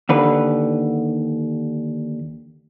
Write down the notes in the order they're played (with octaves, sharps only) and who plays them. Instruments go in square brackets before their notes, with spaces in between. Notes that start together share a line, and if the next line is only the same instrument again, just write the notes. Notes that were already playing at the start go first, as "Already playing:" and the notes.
[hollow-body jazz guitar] D#2 D3 B4